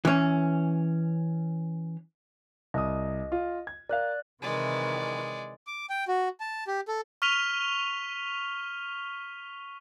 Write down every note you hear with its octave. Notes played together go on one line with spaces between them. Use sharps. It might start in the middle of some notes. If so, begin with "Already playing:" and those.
E3 C#4
C2 D#5 D#6
F4
G#6
A#4 D5 F5 F#6
C3 D#3 E3 G#3 D5
D6
G5
F#4
A5
G4
A4
C#6 F6 B6 D#7 F7 G7